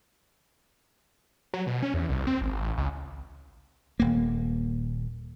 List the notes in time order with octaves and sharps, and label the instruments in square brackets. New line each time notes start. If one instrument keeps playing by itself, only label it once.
[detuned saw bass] F#3
B2
C#4
E2
C2
C4
G#1
A1
C#2
[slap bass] D#1 A#3